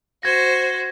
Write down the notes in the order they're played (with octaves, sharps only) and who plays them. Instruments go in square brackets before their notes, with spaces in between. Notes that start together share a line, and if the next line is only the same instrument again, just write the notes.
[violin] F#4 C5 [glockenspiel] G#6 A#6